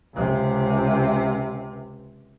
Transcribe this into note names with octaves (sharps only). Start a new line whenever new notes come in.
C#2 C3